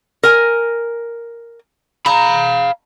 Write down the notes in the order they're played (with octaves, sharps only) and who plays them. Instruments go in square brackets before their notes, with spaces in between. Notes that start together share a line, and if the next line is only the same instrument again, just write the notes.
[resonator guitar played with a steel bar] A#4 G#5
[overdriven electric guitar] F5 B5 [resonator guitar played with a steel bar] A#5